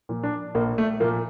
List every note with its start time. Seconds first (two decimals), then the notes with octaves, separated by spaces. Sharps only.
0.09 A#2 F3
0.23 D4
0.55 A#1 A#3
0.78 A3
1.00 A#2 F3 A#3